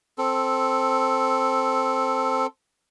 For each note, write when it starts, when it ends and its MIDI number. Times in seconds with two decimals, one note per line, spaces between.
0.18 2.47 60
0.18 2.47 69